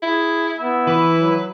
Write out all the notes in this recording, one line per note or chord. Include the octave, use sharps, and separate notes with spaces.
E4 G#4
B3 E4
E3 B4
F#3